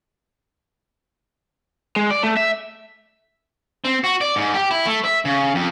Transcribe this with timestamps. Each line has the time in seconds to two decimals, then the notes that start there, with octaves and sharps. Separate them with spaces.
1.96 G#3
2.11 D5
2.23 A3
2.37 E5
3.85 C4
4.04 F#4
4.21 D5
4.36 G#2
4.54 G4
4.71 E4
4.86 A3
5.04 E5
5.25 C#3
5.55 F2